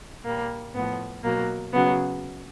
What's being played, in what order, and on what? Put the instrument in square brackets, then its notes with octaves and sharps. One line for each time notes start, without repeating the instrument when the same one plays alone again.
[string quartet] A#2 G3 A#3
A2 F3 B3
B2 F#3 A#3
C#3 F#3 B3